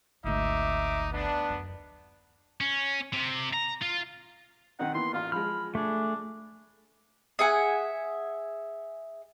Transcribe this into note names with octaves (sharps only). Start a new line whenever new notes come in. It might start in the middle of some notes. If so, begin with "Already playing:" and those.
G#1 D2 D#4 E5 D6
B3 D4
F#2
C#4
C3
A#5
F4
D#3 C4 D#4 F#5
E3 A#3 B3 C6
A1 F4 F5 C6
F3 G#3 B5 F6
A3 D4 G#4
G#4 E5 F#5 G#5